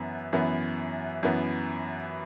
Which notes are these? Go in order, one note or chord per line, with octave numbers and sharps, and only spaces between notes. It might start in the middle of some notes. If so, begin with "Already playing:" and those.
Already playing: F#2 E3 B3
F#2 E3 B3
F#2 E3 B3